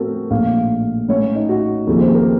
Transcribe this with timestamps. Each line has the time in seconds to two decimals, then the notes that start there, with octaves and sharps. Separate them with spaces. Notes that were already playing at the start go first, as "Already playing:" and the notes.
Already playing: A2 A3 C4 F#4 A4 A#4
0.31 A#1 A2 A3 F5
1.09 A2 A3 C#4 C#5
1.35 D#4
1.49 F#4
1.87 D#2 C#3 F3 C4 A4
2.01 C5
2.14 A#4